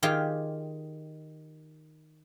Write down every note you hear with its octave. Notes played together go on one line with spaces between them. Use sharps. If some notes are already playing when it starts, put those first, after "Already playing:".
D#3 F4 G4 G#4